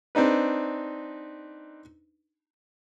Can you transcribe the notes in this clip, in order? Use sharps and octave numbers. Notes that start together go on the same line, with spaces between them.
C4 D4 D#4 B4